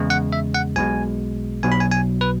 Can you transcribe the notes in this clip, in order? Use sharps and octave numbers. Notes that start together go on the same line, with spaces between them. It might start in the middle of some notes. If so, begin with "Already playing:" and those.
Already playing: E2 C#3 G#3
F#5
E5
F#5
B1 B2 G#3 G#5
B1 B2 F#3 G#5
B5
G#5
G#5
B4